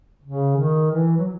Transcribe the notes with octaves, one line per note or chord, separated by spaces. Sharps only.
C#3
D#3
E3
F#3